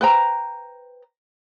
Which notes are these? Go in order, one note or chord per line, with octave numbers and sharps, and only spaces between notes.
B4 C5 G5 A#5